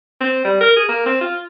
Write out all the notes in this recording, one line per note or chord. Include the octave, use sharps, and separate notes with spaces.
C4
G3
A#4
G#4
A#3
C4
F4